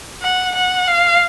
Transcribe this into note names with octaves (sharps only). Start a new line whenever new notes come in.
F#5
F#5
F5